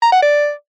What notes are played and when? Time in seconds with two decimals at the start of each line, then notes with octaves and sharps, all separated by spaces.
0.02 A#5
0.12 F#5
0.22 D5